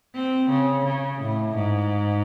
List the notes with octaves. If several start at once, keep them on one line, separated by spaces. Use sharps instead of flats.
C4
C#3
C#3
A2
G#2